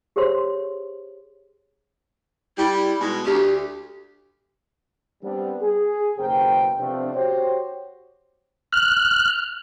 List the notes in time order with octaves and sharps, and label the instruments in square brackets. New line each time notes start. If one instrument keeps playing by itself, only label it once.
[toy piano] G4 G#4 C5 C#5 C6
[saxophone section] G3 [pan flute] E4
[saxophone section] B2 G#3
[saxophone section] D2 [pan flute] G4
[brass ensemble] G3 B3 C4 D4
G#4
F#1 D#2 B2 A#4 C5 G5
C3 F3 A3 B3 C4 D4
F#4 G4 C5 C#5
[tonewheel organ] F6 F#6